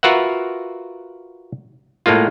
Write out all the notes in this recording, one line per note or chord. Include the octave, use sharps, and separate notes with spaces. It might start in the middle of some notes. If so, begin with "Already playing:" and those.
F4 F#4 A#4 B4 E5 F#5
A2 G#3 A#3 F4